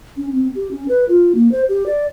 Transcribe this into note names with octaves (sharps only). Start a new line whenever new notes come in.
C#4
C4
G4
C#4
B4
F4
A#3
C5
G4
D5